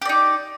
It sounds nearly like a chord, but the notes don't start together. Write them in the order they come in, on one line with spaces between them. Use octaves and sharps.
G4 D5 D#4